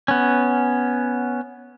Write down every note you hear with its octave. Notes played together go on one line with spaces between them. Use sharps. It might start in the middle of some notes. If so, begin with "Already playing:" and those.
B3 C#4